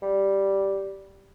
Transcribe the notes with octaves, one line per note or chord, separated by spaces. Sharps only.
G3